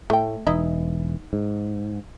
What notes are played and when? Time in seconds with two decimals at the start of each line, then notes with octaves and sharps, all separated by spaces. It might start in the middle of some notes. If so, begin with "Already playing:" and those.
0.10 A2 A3 G5
0.47 E1 E3 D#4 E4 D#5
1.33 G#2